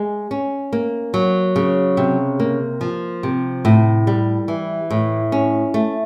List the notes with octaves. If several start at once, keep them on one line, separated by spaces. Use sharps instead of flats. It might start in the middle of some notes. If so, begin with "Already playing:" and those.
Already playing: G#3
C#4
A#3
F#3
C#3
C3
A#3
F3
C3
A2
G3
E3
A2
C#4
A3